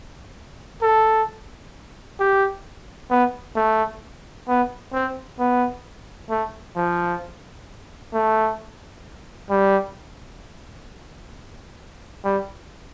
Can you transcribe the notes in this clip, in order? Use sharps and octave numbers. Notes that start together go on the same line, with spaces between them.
A4
G4
B3
A3
B3
C4
B3
A3
F3
A3
G3
G3